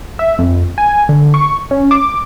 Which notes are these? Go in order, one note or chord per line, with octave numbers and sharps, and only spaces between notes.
E5
F2
G#5
D3
C#6
C#4
D6